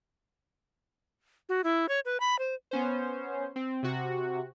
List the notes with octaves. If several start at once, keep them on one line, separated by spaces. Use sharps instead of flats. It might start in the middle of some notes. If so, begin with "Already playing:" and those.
F#4
E4
C#5
B4
B5
C5
B3 C#4 C5
C4
C3 F#4